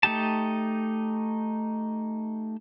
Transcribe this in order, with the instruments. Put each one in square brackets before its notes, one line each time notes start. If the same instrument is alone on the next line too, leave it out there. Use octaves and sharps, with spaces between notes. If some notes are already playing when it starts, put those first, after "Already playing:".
[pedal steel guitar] A3 D#4 G4 A5